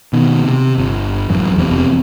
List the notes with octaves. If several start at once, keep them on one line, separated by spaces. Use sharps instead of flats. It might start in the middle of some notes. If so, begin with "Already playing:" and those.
B2 D#3
C3
G1
A1 F#2
F1 E2 A2 C3